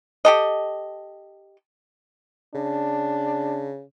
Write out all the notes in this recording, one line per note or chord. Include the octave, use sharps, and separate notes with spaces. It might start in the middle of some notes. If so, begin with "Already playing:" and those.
G4 A4 D#5
C#3 D4